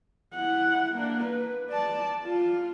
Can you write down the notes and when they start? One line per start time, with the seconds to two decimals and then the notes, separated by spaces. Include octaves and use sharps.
0.34 E4 F#5
0.94 A#3 D4
1.24 B4
1.70 D5 A5
2.24 F4